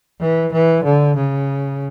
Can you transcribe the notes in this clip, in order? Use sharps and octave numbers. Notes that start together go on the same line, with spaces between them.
E3
E3
D3
C#3